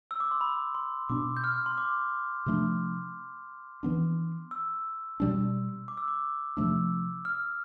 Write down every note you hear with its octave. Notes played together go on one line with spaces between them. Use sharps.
E6
D6
C6
B5
C6
B2 B3 D4 D6
G6
F6
C6
D6
C3 F3 A3 D4
E3 B3 D4
E6
B2 G3 D4
D6
E6
D6
C3 F3 A3 D4 E6
F6